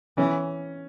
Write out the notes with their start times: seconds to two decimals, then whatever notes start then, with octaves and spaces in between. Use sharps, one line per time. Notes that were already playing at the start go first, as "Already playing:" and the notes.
0.17 E3 C#4